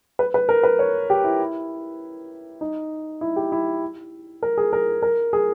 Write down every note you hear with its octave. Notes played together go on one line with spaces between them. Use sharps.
B4
B4
A#4
B4
C#5
G4
E4
D#4
E4
G4
E4
A#4
G#4
A#4
A#4
G#4